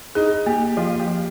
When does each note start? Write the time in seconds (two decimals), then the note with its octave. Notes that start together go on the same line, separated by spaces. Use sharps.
0.15 D#4 G#4
0.46 A#3 G4
0.77 F3 F4
0.99 G4
1.08 F3